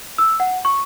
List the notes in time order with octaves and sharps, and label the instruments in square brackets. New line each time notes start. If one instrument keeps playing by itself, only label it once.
[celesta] E6
F#5
C#6